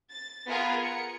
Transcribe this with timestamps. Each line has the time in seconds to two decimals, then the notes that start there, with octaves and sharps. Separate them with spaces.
0.11 A6
0.48 B3 F4 G#4 A#4 G#5 A#5
0.83 C#7